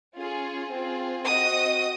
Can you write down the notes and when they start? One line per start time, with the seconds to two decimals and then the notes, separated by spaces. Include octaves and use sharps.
0.16 C#4 F4 G#4
0.72 C4 F4 G#4
1.27 C4 F#4 D#5 D#6